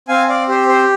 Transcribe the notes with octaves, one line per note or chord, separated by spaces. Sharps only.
C4 F5 G#5
D5 F5
G4 C5
C5